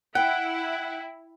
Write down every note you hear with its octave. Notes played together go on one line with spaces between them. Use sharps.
E4 F#5 G5